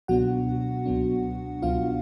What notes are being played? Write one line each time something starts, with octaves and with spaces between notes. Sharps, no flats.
C#2 B2 F#3 B3 D4 F#4 F#5
C#2 B2 F#3 B3 D4
C#2 B2 F#3 B3 D4 F4 F5